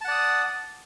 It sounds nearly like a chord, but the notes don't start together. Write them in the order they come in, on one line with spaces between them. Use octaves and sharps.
A5 F#5 D5 D#6